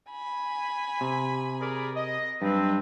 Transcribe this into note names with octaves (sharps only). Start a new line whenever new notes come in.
G#5 B5
C3
G#4 A#4 D5
D#5
G2 F#3 C4 B4